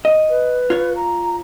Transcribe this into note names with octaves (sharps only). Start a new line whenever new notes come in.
D#5
B4
F4 C#5
A#5